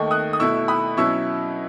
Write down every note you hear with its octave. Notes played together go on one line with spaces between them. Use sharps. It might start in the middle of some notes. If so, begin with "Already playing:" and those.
Already playing: D#2 D#3 A3 D#4 C#6
D#6 F#6
D#6
B2 A3 E4 C#6 E6
B5 D#6
B2 F#3 C#4 E4 C#6 E6